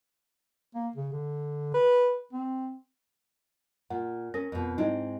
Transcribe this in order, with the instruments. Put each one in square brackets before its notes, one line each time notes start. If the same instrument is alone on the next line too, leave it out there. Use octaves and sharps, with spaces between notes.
[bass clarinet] A#3
C#3
D3
B4
C4
[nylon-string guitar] A#2 [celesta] F#5
[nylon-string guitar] C#4 [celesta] A#4 A#6
[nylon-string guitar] F2 B2
[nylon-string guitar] G#2 G#3 C4 [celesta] D#4 E4 D#5